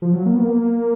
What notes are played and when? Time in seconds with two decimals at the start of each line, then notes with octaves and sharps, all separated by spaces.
0.02 F3
0.13 F#3
0.26 A#3
0.33 B3
0.42 A#3